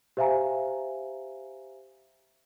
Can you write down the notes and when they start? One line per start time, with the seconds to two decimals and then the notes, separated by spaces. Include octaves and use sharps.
0.17 G4 C5 E5 F5 G#5 A#5